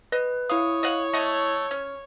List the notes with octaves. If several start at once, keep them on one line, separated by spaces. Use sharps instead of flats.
B4 D#5
E4 C#5 F5 D#6
D#5 F5 F#5
A3 D#5 F#5
C#4